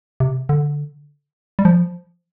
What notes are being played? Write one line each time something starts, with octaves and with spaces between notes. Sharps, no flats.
C3
D3
G3
F3